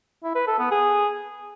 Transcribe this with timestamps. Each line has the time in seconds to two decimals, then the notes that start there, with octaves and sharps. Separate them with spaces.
0.23 E4
0.35 B4
0.47 A4
0.59 B3
0.71 G#4